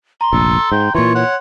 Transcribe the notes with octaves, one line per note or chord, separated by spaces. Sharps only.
A#5 C6
F1 A#1 A4
G#2 G5
A#2 E3 F4 C#5 C6
C#5 F#5